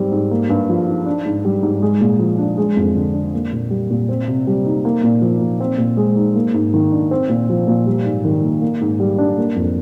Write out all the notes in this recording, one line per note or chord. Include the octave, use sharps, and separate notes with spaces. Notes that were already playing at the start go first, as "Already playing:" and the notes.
Already playing: G#2 G3 C4
G#2
A#3
G2
F3
D#4
D4
G#2
G3
G#2
G#3
A#2
F3
D4
G#3
F2
D3
D4
A#3
A#2
G3
A#2
C4
C3
G3
D#4
A#3
A#2
F3
A#2
C4
A#2
G#3
D#4
A#3
G#2
D#3
D4
C4
A#2
F3
A#2
G3
G#2
D#3
A#3
A#3
G#2
G3
D4
A#3
F2